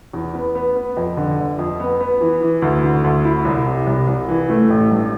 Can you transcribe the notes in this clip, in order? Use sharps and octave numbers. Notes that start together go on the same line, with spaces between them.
E2
B3
B3
B3
F2
D3
G1
F2
B3
B3
E3
E3
D2
D3
D2
E4
C2
C3
C2
C2
E3
A3
A1
G2